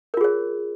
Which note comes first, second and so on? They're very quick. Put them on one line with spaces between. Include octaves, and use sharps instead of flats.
A#4 F4 G#4 C#5